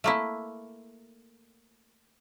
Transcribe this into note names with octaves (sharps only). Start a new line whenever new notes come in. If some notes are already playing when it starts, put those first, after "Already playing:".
A3 A#3 E4